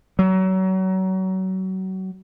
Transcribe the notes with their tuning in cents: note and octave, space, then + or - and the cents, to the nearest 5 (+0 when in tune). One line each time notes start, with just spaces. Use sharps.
F#3 +30